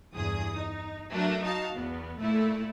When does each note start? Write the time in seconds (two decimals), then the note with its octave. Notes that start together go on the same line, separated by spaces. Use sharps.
0.14 E2 G2 G#4 D#6
0.57 D#4
1.10 F#3 A3 D4 F#4 A#4
1.42 D#4 F#4 F5 A5
1.75 E2 B3
2.20 A#2 A3 E4